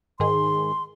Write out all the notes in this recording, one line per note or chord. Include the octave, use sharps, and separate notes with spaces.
G#2 D#3 G#4 C6